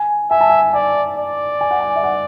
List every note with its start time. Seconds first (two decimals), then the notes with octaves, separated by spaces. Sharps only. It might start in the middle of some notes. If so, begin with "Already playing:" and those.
Already playing: G#5
0.31 E5 G#5
0.41 A5
0.50 G#5
0.73 D5 G#5
1.17 D5
1.61 G#5
1.71 F#5
1.80 G#5
1.96 E5
2.03 F#5